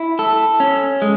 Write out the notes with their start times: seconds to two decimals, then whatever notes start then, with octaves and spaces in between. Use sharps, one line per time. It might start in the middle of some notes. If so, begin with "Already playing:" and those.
Already playing: E4
0.19 A4
0.60 C#4
1.02 G#3